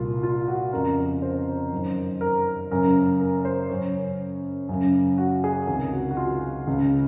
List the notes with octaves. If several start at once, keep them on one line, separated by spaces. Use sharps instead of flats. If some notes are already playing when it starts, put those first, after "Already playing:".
Already playing: C2 A#2 F4
F4
F#4
F2 C#3 A#4
C5
F#2 D#3
A#4
F#2 C#3 A#4
A#4
A#4
C5
F#2 C#3 C#5
F#2 C#3
F#4
G#4
C#2 C3 D#3 G#4
F#4
F#4
F4
C#2 C#3